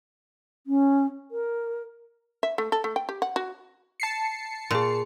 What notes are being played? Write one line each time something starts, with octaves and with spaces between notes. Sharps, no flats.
C#4
A#4
E5
A3
A4
A3
G5
G4
F#5
F#4
A5 C7 C#7
A#2 G#4 C6